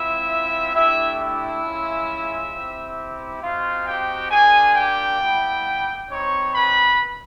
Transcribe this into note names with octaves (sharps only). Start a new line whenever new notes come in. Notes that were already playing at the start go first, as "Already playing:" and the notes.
Already playing: G#3 C4 E4 F4 E5
A3 D4 E4 G4 E5
E4 E5
G#3 C#4 F4
C4 E4 G4
C4 D#4 F4 F#4 F5
G4 G5
A#3 D4 F4 G#4 G#5
G4 G5
G3 B3 E4 G4
G3 C4 D#4 C#5 C#6
B4 B5